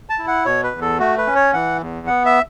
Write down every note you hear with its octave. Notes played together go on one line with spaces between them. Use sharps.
A5
E4
F#5
B2 C#5
B4
E2
A4
A3 F#4
B4
C#4
C#5
E3 F#5
E2
B3 F#5
E5